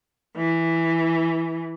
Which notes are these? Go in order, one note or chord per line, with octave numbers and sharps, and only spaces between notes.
E3